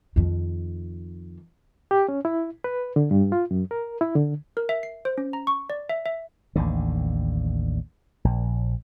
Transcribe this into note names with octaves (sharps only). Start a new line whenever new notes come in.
F2 D#3
G4
C#4
E4
B4
D3
G2
F4
F#2
A#4
E4
D3
A#4
E5
C7
C5
C#4
A#5
C#6
D5
E5
E5
A1 D#2 D3
A#1